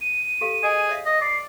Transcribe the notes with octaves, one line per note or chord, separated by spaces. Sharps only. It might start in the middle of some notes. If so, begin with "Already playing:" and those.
D#7
G4 A4 F5
G#4 D#5 G#5
C#5 E5 F5
D#5
D5 C7